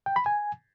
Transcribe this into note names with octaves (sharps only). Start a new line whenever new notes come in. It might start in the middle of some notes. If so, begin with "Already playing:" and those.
G5
B5
G#5